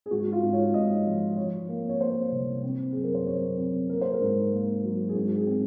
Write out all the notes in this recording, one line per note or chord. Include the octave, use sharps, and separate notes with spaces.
G#4
G#2 F#4
F4
G#2
C#5
G#2 D#5
F3
F3 C#5
A#3
C#5
A#3 C5
C2
C4
F#2 G#4
A#4
C5
F#2 C#5
C4
A#3 A#4
C5
A#4
G#2
A#3
F#3
G#4
G#2 F#4
G#4
C4